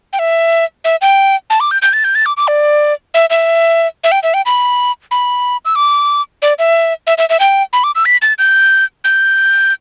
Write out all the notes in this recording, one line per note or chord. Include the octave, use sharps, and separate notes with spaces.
G5
E5
E5
G5
A5
D6
G6
G6
A6
G6
A6
D6
D6
D5
E5
E5
E5
G5
E5
G5
B5
B5
E6
D6
D5
E5
E5
E5
E5
G5
B5
D6
E6
B6
A6
G6
G6